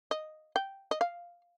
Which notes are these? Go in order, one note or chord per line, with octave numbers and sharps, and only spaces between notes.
D#5
G5
D#5
F5